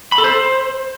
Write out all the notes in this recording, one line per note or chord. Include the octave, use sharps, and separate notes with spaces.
B5
A4
C5